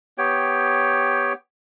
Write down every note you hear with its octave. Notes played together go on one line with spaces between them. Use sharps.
B3 G4 C#5 G5